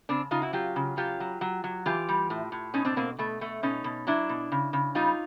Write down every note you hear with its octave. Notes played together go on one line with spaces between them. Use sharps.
C#3 C4 D4
C#3 D#4 F4
E4 F#4
F#3 F4 G4
C#3
F#3 F4 G4
F#3
F#3
F#3
E3 F4 G4
G3
A2
A2
B2 C#4 D#4
C4 D4
B2 A#3 C4
B2 A3
B2 A3
B2 C#4 D#4
B2
F#3 D4 E4
B2
C#3
C#3
G3 D#4 F4